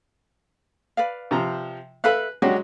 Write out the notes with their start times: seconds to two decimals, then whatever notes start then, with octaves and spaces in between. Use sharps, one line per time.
0.97 B4 D5 F5
1.31 C3 F3 A#5
2.04 A4 B4 E5 F5 F#6
2.42 F#3 G#3 C#4 D4 F#4 G4